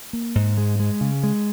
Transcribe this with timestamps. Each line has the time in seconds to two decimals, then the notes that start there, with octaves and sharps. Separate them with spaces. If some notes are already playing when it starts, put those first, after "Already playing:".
0.13 A#3
0.35 G#2
0.58 G#3
0.80 G#3
1.01 C#3
1.23 G#3